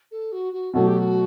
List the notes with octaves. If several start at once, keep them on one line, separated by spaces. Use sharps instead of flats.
A4
F#4
F#4
B2 F#3 A3 F#4
G4
F#4